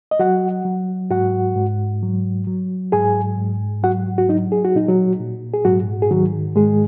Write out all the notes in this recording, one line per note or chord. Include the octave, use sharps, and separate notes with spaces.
D#5
F#3 F#4 F#5
F#3
G#2 F#4 F#5
G#2
F#3
F#3
G#2 G#4 G#5
G#2
F#3 F#4 F#5
F#4
F#3 D#4
G#4
F#4
A#2 D#4
F#3 F#4
A#2
G#4
G#2 F#3 F#4
G#4
D#3 F#3 F#4
G#2 G#3 G#4